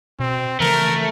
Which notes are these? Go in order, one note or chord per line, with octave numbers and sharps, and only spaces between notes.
B2 C4
C#3 E3 F3 A3 A#4